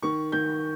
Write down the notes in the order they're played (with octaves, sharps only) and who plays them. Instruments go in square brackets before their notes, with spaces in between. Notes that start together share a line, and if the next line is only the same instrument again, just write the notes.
[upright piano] D#3 C#6
D#3 G6